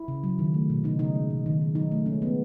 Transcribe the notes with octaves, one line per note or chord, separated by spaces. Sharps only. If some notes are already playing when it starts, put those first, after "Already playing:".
Already playing: E4
C#3
F#3
D#3
A3
B2
C#3 D#4
C#3 D#4
G#3
B2
D#3
D#3
F#3 D#4
A3
G#3 C#4
G#3 B3